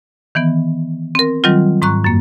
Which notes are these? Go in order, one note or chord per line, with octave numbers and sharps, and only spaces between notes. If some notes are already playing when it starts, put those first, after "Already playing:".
D#3 E3 B3
C4 A#4
D#3 F#3 G3 C4 F4
G#2 A#5 C#6 F#6
F#2 A#3